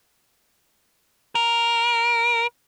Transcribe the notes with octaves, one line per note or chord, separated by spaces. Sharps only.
A#4